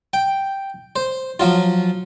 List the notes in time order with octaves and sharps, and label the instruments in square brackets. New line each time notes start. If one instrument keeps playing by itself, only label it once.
[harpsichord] G5
C5
F3 F#3 F4